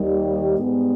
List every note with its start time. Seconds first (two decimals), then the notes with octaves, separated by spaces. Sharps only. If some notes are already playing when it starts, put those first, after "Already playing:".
Already playing: D#2 D#3 G3
0.57 G#2 G3 B3